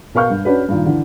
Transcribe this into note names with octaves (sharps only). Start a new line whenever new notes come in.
B2 A#4 F5 C#6 F6 G6
G2
C#4 D4 F#4 B4
G2 A#2 D#3
D3 E3